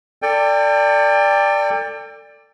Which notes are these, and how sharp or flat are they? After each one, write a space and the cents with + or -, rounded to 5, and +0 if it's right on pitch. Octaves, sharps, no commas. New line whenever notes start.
A4 +30 D5 +0 G5 +30